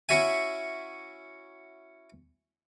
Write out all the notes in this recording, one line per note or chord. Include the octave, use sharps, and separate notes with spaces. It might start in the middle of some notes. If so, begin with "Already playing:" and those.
C#4 E4 F#4 E5 G#5